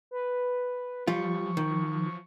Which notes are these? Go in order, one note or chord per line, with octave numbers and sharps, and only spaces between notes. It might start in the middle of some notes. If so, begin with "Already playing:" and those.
B4
F3 G3 F4 C#6
D#3